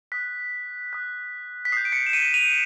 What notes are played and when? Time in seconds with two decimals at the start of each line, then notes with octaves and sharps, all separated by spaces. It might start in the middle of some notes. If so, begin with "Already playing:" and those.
0.12 D#6 F#6 B6
0.93 D#6 F#6
1.65 B6
1.72 D#6 G6 C7
1.85 D7
1.93 B6 C#7
2.06 E7
2.13 C#7 D#7
2.34 D#7 F7